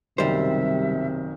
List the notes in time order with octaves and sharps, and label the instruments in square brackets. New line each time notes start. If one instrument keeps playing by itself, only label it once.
[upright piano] F#1 B1 D#3 [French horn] C3 [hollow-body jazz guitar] G3 C5 [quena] E5